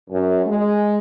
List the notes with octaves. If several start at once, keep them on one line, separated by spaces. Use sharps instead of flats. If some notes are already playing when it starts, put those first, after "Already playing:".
F#2
G#3